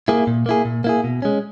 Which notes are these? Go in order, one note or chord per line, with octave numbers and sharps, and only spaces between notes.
A#3 E4 G#4
A#2
A#3 E4 G#4
A#2
A#3 E4 G#4
B2
G#3 C#4